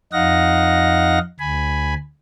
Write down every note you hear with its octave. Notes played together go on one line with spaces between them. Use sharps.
F2 D#4 D#5 F5 F#5 A#6
D2 G#5 B5